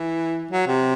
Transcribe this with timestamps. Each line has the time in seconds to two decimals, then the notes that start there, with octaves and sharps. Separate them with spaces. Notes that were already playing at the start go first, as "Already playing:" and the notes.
Already playing: E3
0.51 F#3
0.67 C3